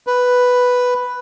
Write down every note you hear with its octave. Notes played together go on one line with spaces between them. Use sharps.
B4